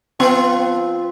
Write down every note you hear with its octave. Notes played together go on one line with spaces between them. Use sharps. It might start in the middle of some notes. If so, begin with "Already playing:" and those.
F3 B3 C4 F4 B4